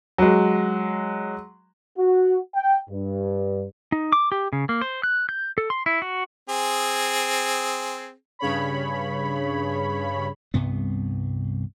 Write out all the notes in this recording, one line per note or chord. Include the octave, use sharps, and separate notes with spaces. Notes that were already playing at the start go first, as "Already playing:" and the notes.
F#3 G#3
F#4
G5
G2
D#4
D6
G4
C#3
A#3
C5
F#6
G6
A4
C6
E4
F#4
C4 G#4
G2 C#3 C#5 B5
C2 G2 C3 B3